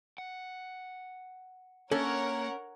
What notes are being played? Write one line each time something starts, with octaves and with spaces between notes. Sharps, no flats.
F#5
A#3 C#4 A4 A#4 C#5 F#5